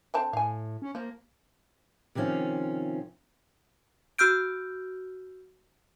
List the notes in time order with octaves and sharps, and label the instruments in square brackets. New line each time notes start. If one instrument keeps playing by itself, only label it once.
[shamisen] D3 C4 A5
[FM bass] A2 [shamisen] F5 G#5
[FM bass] C#4
[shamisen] F3 [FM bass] A#3
[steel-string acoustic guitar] C3 D#3 F3 C#4 F4
[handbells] F#4 E6 F6 G6 D7